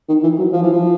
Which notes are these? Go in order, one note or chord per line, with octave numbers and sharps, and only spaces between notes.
D#3
E3
F#3
F3
E3
F3